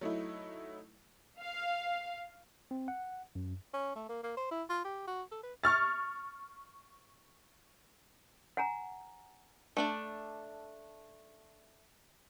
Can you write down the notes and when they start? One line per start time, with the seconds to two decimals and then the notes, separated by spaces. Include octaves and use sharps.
0.01 F#3 A3 D#4 E4
1.40 F5
2.71 C4
2.88 F#5
3.35 F#2
3.73 C#4
3.95 A3
4.09 A#3
4.23 A#3
4.37 C5
4.51 E4
4.70 F4
4.85 G4
5.07 F#4
5.32 A4
5.43 B4
5.64 C#6 F6 A6
8.57 F#5 G#5 A#5
9.77 A3 D4 D5